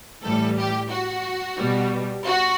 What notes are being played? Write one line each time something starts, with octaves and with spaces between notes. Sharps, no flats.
A2 E3 G3 A4
G4
F#4
B2 G3
F#4